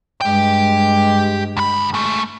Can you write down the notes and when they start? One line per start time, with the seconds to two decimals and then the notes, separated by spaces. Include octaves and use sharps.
0.21 G2 G#3 G4 G5
1.57 D2 B5
1.94 G#3 A3